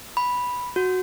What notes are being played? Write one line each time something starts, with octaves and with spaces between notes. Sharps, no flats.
B5
F#4